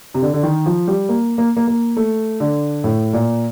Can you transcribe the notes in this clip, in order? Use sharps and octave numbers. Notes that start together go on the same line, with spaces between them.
C3
D3
D3
D#3
F3
G3
A#3
A#3
A#3
A#3
A3
D3
A2
A#2